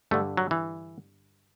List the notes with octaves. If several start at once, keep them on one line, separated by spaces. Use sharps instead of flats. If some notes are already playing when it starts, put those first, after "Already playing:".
G2 D3 A3
F#3
E3